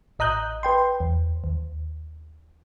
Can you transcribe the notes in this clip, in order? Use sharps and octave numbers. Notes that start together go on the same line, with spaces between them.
A1 D#5 A#5 D#6 F#6 G6
B4 G5 C6
E2
D#2